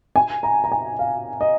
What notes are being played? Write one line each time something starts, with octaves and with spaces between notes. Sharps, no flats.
G#5
A#5
A#5
G#5
F5
D#5